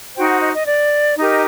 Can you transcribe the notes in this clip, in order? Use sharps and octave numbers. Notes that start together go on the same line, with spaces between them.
D#4 F#4 C5 G5
F#5
D#5
D#5
D5
D#4 G4 A#4 D#5